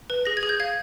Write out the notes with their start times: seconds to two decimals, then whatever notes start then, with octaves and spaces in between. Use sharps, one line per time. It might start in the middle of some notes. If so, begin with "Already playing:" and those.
0.10 B4
0.25 G#4 A#6
0.37 G#6
0.43 G#4
0.49 G6
0.60 F5 G#6